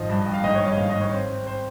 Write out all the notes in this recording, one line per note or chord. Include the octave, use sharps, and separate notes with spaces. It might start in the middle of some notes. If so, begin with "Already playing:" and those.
Already playing: G#1 F3 D#5
G2
G2
F5
G#1 D#5
C#5
G2
D#5
G#1 F5
D#5
G#1
C#5
C4 C5
C4
C5